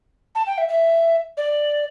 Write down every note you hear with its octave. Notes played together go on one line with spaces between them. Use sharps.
A5
G5
E5
E5
D5